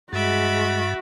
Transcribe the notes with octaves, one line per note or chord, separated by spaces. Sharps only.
G2 G#3 F#4 E5 B5 D6 A6